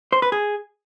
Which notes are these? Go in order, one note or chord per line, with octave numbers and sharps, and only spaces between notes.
C5
B4
G#4